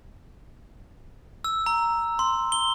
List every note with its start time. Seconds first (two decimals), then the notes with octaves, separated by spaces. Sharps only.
1.44 E6
1.66 A#5
2.19 C6
2.52 G7